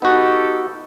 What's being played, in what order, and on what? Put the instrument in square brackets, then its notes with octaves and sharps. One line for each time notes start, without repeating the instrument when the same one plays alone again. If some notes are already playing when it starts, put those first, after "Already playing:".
[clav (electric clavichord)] B3 F#4 [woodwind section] D#4 G4 A4